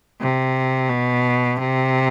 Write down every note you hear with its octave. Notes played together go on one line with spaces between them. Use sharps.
C3
B2
C3